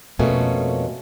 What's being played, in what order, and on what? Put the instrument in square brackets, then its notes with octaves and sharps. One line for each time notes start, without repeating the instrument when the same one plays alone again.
[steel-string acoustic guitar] F2 B2 A3 A#3 C#4